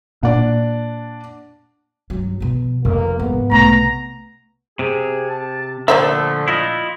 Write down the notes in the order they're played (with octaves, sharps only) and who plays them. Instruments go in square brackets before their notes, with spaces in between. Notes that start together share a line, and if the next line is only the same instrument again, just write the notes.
[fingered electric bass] A#2 [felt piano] D4 D5 F#5
[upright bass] G2 F#3
B2 F3
[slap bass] F1 [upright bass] F2 [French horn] A#3
[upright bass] G#2 [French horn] B3
[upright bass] B1 C3 [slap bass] A3 [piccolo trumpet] A#5
[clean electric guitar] C3 [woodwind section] G#4
[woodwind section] A5
[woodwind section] A#2 F3 A3 [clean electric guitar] D3 [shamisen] A#3 C5 E5
[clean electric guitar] E4 F4 D#5